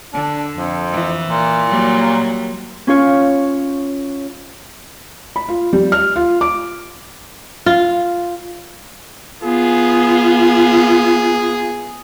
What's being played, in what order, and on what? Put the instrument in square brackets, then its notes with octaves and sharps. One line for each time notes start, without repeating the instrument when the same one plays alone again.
[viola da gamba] D3 [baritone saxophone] D4
[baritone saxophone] F2
[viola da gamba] E3
[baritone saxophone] A#2
[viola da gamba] F#3 G3 A#3
[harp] C#4 F4 C#5
[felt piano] B5
F4
G3
F6
F4
D6
[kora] F4
[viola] B3 F4 [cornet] G#4